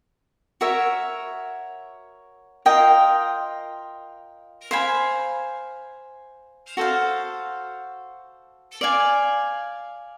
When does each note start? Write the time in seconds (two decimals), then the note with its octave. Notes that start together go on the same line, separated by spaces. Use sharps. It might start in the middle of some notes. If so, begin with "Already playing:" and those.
0.61 F#4 A#4 C#5 E5
2.66 F4 A#4 D#5 G5
4.71 C5 F5 G#5 B5
6.77 F#4 A4 C5 F5
8.81 D5 F5 G#5